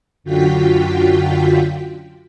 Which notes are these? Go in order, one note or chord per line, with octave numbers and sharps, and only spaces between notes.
F#2 D3 F4 F#4 G5 B6